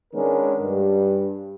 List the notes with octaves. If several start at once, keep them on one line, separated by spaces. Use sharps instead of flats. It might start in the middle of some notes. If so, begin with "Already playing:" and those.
D#3 G#3 B3 C#4 D4 A#4
G2